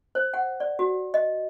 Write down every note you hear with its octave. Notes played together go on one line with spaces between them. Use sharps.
C5
F#5
D5
F#4
D#5